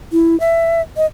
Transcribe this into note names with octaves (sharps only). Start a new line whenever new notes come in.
E4
E5
D#5